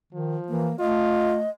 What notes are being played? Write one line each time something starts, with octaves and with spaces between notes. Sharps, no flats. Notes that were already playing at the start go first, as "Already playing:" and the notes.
D#3 F3
E3 A#3
A3 F4 D#5